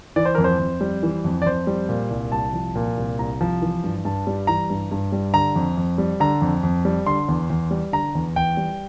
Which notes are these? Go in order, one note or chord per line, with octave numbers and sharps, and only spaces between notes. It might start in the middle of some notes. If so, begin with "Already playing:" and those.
E3 D5
C5
F2 A#4
C5
F2
G3
E3
F2
D5
F2 C5
G3
A#2
C2
C2 A5
F3
A#2
C2
C2 A#5
F3
E3
G2
G2 A5
G3
E3 A#5
G2
G2
G3
D3 A#5
F2
F2
G3
D3 A#5
F2
F2
G3
D3 C6
E2
E2
G3
D3 A#5
E2
E2 G5
G3